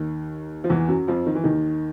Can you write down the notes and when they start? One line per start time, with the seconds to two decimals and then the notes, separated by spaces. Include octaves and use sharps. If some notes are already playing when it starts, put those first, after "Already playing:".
Already playing: D#2 D#3
0.64 F3
0.70 E2 E3
0.88 F#2 F#3
1.08 F2 F3
1.26 D#3
1.35 E3
1.44 D#2 D#3